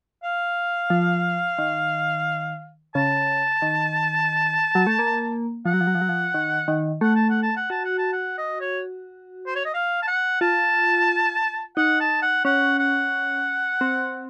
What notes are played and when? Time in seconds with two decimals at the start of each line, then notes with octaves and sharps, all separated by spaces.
0.23 F5
0.90 F3
1.58 D#3
2.95 C#3 A5
3.62 D#3
4.75 F#3
4.87 A3
4.99 A#3
5.66 F3 F#5
5.74 F#3
5.81 F3
5.87 F#3
5.95 F3
6.01 F#3
6.09 F3
6.34 D#3
6.68 D#3
7.01 A3 F#5
7.16 A5
7.30 F#5
7.43 A5
7.57 F#5
7.70 F#4 A5
7.85 F#5
7.98 A5
8.13 F#5
8.38 D#5
8.60 C#5
9.46 C5
9.55 C#5
9.65 D#5
9.74 F5
10.02 A5
10.07 F#5
10.41 F4 A5
11.77 D#4 F#5
12.00 A5
12.22 F#5
12.45 C#4 F#5
12.79 F#5
13.81 C4